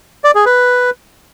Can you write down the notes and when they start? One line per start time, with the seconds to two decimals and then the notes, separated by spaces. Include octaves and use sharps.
0.24 D5
0.35 G#4
0.46 B4